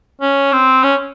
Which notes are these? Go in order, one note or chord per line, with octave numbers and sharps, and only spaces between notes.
C#4
C4
C#4